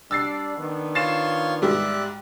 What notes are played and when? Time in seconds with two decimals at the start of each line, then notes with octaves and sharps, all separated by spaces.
0.11 G3 D4 E6 A6 C7
0.58 D#3 B3 D4
0.95 F4 C#5 C6 A6 C7 E7
1.62 G#2 G3 D5 E5 F#6